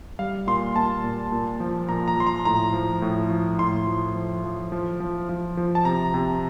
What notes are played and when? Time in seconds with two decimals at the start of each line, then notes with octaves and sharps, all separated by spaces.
0.19 G3 F5
0.47 A#2 C6
0.76 A#2 A5
1.04 A#2
1.32 A#2
1.60 F3
1.89 A#2 A#5
2.08 A#5
2.17 F3 C6
2.27 A#5
2.45 A2 A#5
2.74 F3
3.02 A2
3.31 F3
3.59 A2 C6
3.87 F3
4.15 F3
4.44 F3
4.72 F3
5.00 F3
5.29 F3
5.57 F3
5.75 A5
5.85 C3 A#5
6.14 C3